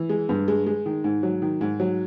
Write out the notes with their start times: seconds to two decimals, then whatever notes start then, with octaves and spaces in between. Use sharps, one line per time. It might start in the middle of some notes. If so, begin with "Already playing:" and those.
Already playing: E3
0.09 G#3
0.29 G2
0.48 G#3
0.67 G#3
0.86 D#3
1.04 G#2
1.23 F#3
1.42 D#3
1.61 G#2
1.80 F#3